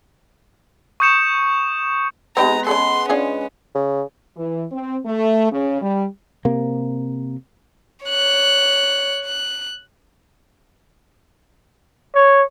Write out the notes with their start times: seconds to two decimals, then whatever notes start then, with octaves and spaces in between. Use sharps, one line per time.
1.00 C#6 D#6 G6 C#7 E7
2.37 G#3 B3 C4 D#4 G4 A#5
2.67 C#4 G#4 A4 C6
3.09 C#4 D4 F4 G#4
3.75 C#3
4.37 E3
4.71 C4
5.06 A3
5.51 C#3
5.81 G3
6.45 C3 A#3
8.06 C#5 F#6
9.25 F#6
12.15 C#5